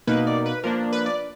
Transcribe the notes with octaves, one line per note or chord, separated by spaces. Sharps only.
B2 A#3 D#4 B4
D5
B4
F3 A#3 D4 A#4
B4
D5